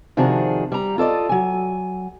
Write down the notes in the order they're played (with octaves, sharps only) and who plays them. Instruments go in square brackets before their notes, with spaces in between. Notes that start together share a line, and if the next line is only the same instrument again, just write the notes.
[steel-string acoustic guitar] C3 D#3 F3 D4 F#4 G#4
G3 A#5
F4 A4 D5 D#5
F#3 G#5